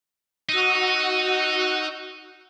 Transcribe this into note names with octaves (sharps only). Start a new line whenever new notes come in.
D#4 F#4 F#5 E6